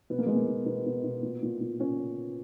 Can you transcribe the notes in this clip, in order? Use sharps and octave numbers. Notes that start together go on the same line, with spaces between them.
B2 B3
A#3
B2 G#3
A#3
B2
B2 B3
B2
B2
A#2
A#2
A#2
A#2 C#4